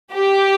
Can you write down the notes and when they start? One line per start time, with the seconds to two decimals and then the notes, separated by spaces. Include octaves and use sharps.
0.14 G4